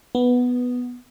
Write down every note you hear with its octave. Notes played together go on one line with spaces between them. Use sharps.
B3